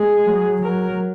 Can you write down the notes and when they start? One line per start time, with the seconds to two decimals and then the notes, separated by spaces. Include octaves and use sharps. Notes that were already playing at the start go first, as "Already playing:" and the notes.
Already playing: G#3 G#4
0.27 F#3
0.62 F#3 A#4